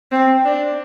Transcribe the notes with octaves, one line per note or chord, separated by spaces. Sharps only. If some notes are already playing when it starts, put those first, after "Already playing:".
C4
D4